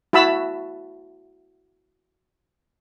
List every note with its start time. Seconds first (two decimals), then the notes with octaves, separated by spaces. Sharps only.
0.13 E4 F#4 A5 B5 E6